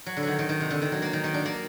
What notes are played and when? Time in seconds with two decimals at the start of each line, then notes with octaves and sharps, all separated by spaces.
0.06 F#3
0.17 D3
0.23 D#3 F#3
0.39 D#3
0.49 D#3
0.60 C3
0.71 D3
0.82 D#3
0.92 F#3
1.02 A#3
1.13 D#3
1.24 D#3
1.34 D4
1.46 A#3